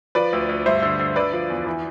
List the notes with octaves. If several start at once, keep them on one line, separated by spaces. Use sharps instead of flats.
F3 B4 D5
D2
D2
G2 C5 E5
D3
D3
D3 B4 D5
F3
E2
E3